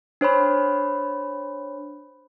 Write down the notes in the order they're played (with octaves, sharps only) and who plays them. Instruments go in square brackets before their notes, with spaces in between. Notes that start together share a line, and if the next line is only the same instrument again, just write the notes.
[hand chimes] D4 C5 C#5 B5